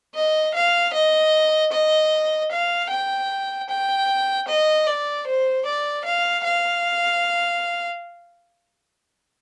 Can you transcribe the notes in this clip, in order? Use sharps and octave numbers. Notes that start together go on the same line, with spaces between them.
D#5
F5
D#5
D#5
F5
G5
G5
D#5
D5
C5
D5
F5
F5